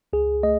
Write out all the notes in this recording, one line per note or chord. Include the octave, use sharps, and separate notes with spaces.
C#2 G#4
A3 D#5